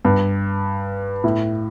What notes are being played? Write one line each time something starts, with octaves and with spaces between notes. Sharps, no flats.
G2
A2